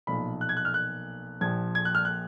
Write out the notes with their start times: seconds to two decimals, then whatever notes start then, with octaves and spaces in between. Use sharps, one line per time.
0.07 B1 A#2 F3 B5
0.41 F#6
0.49 G#6
0.57 F#6
0.65 F6
0.74 F#6
1.41 A#1 A#2 F3 G#6
1.75 G#6
1.85 F#6
1.95 F6
2.05 F#6